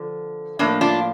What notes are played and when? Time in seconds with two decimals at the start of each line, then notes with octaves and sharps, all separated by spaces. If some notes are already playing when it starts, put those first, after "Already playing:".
Already playing: D3 F3
0.59 A2 F3 A#3 D4
0.81 D4 F4